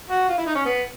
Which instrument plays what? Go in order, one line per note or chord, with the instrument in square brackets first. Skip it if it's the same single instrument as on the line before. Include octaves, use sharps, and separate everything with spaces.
[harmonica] F#4
F4
E4
D#4
C#4
B3